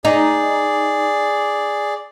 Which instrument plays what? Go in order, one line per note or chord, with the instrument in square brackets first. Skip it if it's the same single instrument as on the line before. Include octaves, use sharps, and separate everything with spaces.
[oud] D#4 [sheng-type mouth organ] G#4 D5